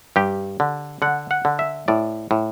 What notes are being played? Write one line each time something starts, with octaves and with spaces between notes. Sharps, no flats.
G2 G4
D3
D3 F#5
F#5
D3
E5
A2 D5
A2